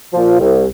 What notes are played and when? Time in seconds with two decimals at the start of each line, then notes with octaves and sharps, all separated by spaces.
0.13 A#2 F3
0.39 C2